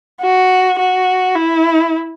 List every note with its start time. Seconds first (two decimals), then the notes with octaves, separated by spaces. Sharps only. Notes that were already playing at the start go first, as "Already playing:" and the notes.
0.21 F#4
0.79 F#4
1.35 E4